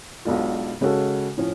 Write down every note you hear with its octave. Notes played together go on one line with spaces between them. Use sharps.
B1 B2 G#3 D4 F4
C#3 G#3 C#4 F#4 A4
A2 F3 C#4